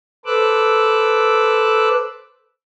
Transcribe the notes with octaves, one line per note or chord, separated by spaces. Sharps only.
A4 B4 C5 D6 E6 F#6